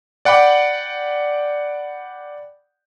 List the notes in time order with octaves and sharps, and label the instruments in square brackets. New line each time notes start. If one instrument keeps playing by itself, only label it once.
[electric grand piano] D5 F#5 G5 B5 D6